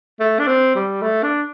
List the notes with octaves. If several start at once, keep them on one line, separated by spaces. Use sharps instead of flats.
A3
D4
C4
G3
A3
D4